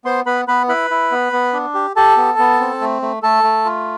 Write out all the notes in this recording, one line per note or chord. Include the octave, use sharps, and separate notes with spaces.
B3 C5 C6
B3 B4 B5
B3 B4 B5
E4 B4 B5
E4
B3
B3
D4
G4
G4 A4 A5
B3
B3
C4
A3
A3
A3 A4 A5
A3
F4